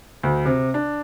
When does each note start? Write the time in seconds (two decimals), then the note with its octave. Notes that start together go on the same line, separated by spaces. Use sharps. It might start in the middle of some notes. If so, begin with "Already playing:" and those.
0.23 D2
0.45 C3
0.74 D4